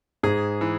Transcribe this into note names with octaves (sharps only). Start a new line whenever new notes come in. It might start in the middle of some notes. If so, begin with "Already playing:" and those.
G#2 G#4
E3